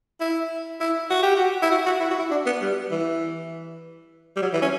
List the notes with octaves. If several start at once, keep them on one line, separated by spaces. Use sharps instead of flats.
E4
E4
F#4
G4
F#4
E4
F#4
F#4
E4
F#4
E4
D4
B3
G3
E3
G3
F#3
E3
C#4